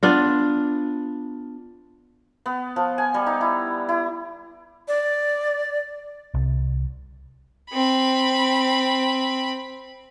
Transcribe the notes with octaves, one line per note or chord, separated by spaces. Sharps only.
B3 D4 F4
B3
F3
G#5
G3
D#4
E4
E4
D5
C2
C4 B5